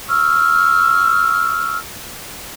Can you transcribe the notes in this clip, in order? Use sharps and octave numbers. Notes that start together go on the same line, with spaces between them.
C#6 E6 F6